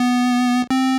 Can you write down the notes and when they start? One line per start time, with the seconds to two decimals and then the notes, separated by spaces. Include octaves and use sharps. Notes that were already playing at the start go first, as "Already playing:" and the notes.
Already playing: B3
0.70 C4